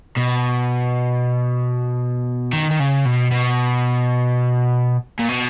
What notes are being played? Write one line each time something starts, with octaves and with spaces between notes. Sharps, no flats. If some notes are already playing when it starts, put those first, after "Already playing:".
B2
D#3
D#3
C#3
B2
B2
A#2
B2